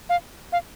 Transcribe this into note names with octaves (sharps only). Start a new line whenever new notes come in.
F5
F5